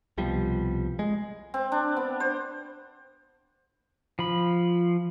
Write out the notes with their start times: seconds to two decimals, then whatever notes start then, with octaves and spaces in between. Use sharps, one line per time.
0.18 C2 B2 F3 G3
0.99 G#3
1.54 C4
1.72 D4
1.97 B3
2.20 C5
4.19 F3 B5